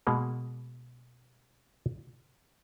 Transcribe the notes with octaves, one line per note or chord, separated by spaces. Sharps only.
B2 G#3 A#3